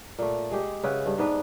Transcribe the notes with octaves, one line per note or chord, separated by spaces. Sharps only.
A#2 A3
G#3 G4
C#3 B4 E5 F#5
G2
G#2 B3 D4 B4